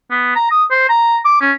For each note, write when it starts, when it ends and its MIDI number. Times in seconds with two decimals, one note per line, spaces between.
0.11 0.31 59
0.36 0.46 82
0.51 0.64 87
0.71 0.85 72
0.89 1.18 82
1.25 1.38 86
1.41 1.52 61